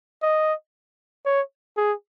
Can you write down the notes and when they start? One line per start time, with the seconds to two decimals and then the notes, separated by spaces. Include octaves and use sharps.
0.22 D#5
1.25 C#5
1.77 G#4